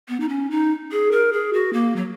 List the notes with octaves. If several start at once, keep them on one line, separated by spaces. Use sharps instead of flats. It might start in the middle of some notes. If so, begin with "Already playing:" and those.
B3
D#4
C#4
D#4
G#4
A#4
G#4
F#4
A#3
F#3